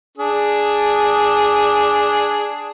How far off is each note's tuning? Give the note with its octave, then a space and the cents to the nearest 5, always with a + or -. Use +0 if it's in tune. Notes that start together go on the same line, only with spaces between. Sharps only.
D4 +0 G#4 +0